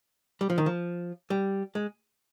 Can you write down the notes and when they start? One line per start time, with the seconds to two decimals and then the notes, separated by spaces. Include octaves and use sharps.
0.41 G3
0.50 F3
0.58 D#3
0.66 F3
1.30 G3
1.75 G#3